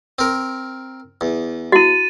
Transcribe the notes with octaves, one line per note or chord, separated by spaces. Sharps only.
C4 A#4
E2
E4 F#4 A6 D#7